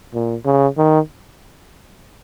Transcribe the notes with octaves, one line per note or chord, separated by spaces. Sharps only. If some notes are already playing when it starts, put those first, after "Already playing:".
A#2
C#3
D#3